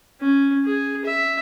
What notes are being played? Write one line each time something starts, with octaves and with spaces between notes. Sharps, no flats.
C#4
G#4
E5